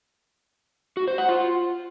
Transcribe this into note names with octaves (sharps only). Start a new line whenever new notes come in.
F#4
C5
F#5
F4